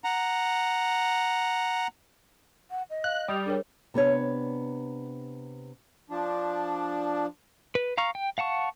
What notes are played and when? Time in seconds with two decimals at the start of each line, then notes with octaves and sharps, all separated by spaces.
0.04 F#5 A#5
2.71 F#5
2.90 D#5
3.04 F5 F#6
3.28 G3 D#6 G6 F7
3.46 D4 G#4 A#4 C#5
3.94 C3 B3 D4 C#5
6.10 F3 D4
7.75 B4
7.98 F5 A#5 C#6 F6
8.15 G5
8.38 F5 F#5 A5 C#6